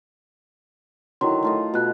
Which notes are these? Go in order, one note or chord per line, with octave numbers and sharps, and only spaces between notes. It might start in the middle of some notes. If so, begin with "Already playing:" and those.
D3 D#3 F#3 E4 C6
A3 F4 D#5
B2 F4 F#6